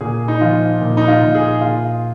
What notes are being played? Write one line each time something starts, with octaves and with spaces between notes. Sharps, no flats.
A#2 G#4
D#4
F3 F4
A#2
D#4
F4
A#2
G#4
A#2 F4